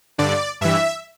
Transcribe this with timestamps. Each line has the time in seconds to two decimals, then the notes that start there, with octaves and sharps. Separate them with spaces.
0.18 G2 D3 D5
0.61 G2 E3 E5